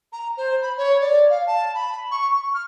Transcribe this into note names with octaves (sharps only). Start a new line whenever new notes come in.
A#5
C5
B5
C#5
D5
F5
A5
B5
C#6
C#6
F6